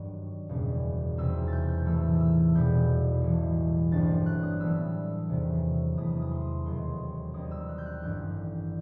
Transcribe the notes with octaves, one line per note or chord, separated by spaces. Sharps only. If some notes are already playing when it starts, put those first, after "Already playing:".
Already playing: G2 D#3 F#3
F#1 E2 B2 G3
E2 C3 F#3 C4 D#4 E6
G6 A6
G6
A2 E3 A3 E6
E6
E1 E2 B2 G3 B3 G6
B1 A2 E3
G1 G2 F#3 A3 C4 A6
F#6
D#6
A2 E3 G3 B3 E6
E2 C3 D#3 F#3
E2 D#3 A3 E4 D#6
D#6
C6
E1 D#2 D#3 F#3 C4 C6
D#2 D#3 G3 C4 D#4 D#6
E6
F#6
G6
F#6
A1 G2 D#3 G6